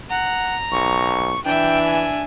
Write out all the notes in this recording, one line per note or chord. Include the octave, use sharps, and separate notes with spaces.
F#5 A#5
B1 C#6
E3 D4 E5 G5
G#5